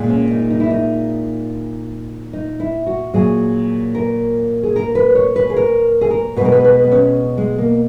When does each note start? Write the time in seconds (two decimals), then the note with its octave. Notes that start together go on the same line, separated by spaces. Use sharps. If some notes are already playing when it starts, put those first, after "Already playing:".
Already playing: A#2 G#3
0.10 C#4
0.31 D#4
0.50 D#4
0.60 E4
0.70 D#4
2.33 D#4
2.60 E4
2.86 F#4
3.14 A#2 F#3 G#4
3.95 A#4
4.63 G#4
4.76 A#4
4.95 B4
5.15 C#5
5.36 B4
5.50 G#4
5.56 A#4
6.01 G#4
6.10 A#4
6.37 B2 B4
6.41 G#3 A#4
6.52 B4
6.64 B4
6.84 B3
6.91 C#4
7.38 G#3
7.58 A#3